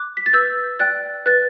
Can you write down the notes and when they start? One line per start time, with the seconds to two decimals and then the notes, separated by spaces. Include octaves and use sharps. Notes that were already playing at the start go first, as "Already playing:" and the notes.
Already playing: D6 F#6
0.17 B6
0.26 A6
0.33 B4 E6 G6
0.79 D5 G5 F#6 A6
1.26 B4 F#6 A6